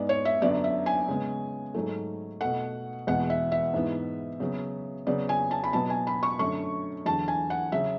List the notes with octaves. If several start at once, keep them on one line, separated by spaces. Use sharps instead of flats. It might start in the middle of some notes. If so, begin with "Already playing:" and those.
Already playing: G#2 G#3 B3 D5
C#5
E5
F#2 D3 F#3 B3 D5
E5
G#5
C#3 G#3 B3
G#2 F#3 A3
B2 A3 F#5
E2 B2 G#3 B3 F#5
E5
E5
G#2 E3 B3
C#3 F#3 B3
C#3 F#3 B3 D5
G#5
A5
B5
B2 F#3 B3 A5
G#5
B5
C#6
F#2 D3 A3 C#6
E2 D3 F#3 A5
G#5
F#5
C#3 F#3 E5